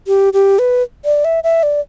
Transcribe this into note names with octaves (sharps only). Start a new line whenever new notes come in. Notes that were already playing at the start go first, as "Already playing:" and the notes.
G4
G4
B4
D5
E5
E5
D5